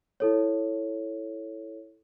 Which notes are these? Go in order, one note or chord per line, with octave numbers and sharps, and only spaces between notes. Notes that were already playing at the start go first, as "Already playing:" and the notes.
E4 A4 C#5